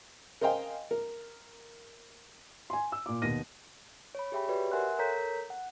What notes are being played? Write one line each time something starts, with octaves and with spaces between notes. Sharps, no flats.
A#4 C5 D#5 F5 G5 G#5
A#4
G#5 C6
E6
A#2 D6
D#2 B2 A#6 D#7
C#5 B5
G4 G#4 E5 G5 B5
F#4 G4 B4 C#5 D5
A#4 E5 F#5 G#5 C6 F#6
A4 A#4 C#5 A#5 G6 B6
F#5